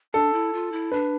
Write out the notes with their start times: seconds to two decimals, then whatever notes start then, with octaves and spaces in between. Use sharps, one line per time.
0.13 D4 A4
0.33 E4
0.53 F4
0.72 E4
0.92 D4 B4